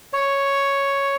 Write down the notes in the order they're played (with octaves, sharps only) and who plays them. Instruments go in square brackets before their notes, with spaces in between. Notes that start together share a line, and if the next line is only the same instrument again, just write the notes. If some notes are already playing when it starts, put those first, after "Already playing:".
[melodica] C#5